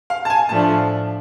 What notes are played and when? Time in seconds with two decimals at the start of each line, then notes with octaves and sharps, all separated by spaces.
0.10 F5
0.25 A5
0.30 G#5
0.49 A2 F3 A3 D4 A5